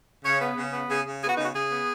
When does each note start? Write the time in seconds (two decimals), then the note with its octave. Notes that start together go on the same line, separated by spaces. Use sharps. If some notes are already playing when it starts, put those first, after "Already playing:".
0.24 C#3 C#5
0.41 B3
0.57 C#3
0.73 B3
0.90 C#3 G#4
1.06 C#3
1.22 B3 G#4
1.29 F#4
1.37 C#3 D#4
1.44 F#4
1.55 C#3 G#4
1.71 B3